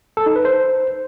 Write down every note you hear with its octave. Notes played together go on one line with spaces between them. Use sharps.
A4
D#4
B4
C5